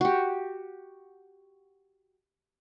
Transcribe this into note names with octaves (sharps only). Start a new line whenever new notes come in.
F#4 G4